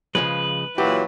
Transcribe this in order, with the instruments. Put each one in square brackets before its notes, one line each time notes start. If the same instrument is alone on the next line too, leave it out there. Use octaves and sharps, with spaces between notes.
[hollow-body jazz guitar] C#3 F3 G#3 [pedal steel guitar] B4
[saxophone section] A#2 E3 F#3 [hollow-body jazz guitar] G4